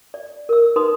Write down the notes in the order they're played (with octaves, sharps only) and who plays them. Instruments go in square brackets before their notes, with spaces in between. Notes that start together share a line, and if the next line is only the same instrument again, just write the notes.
[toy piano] D5
A#4 E6
D#4 B4 C6 D#6